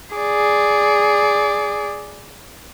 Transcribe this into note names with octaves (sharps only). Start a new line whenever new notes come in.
G#4 D5